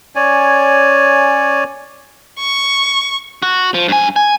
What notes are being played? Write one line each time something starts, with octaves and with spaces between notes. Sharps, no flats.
C#4 C#5 D5 G#5
C#6
F#4
F3
G2 G#5
G#5